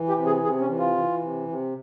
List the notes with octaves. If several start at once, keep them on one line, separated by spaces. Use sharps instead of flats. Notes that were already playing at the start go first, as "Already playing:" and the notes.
Already playing: E3
G4
C3
G#4
C3 G#4
C#4
E3
F4
E3
C3
C3